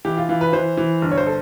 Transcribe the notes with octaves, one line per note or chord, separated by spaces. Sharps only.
E3 G4
F4
E3 F4
B4
E3 C5
E3
G1
C#5
C5
A4